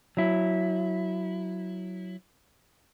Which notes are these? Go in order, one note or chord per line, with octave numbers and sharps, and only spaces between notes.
F#3 E4